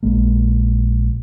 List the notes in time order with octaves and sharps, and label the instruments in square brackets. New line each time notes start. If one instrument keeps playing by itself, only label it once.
[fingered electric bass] A#1 G#3 A#3